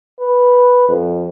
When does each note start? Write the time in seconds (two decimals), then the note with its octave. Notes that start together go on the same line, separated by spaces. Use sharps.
0.19 B4
0.89 F2